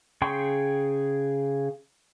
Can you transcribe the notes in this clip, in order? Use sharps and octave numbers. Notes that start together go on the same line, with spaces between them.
C#3 G#4 G5 C6 C#6